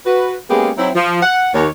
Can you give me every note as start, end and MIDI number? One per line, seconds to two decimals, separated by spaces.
0.06 0.36 66
0.06 0.36 71
0.50 0.71 56
0.50 0.71 58
0.50 0.71 59
0.50 0.71 61
0.50 0.71 67
0.50 0.71 68
0.77 0.90 54
0.77 0.90 60
0.77 0.90 63
0.77 0.90 64
0.95 1.20 53
1.22 1.51 78
1.54 1.69 39
1.54 1.69 73